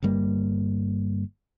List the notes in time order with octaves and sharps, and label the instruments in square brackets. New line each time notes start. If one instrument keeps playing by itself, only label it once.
[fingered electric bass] G1 G2 G3 A#3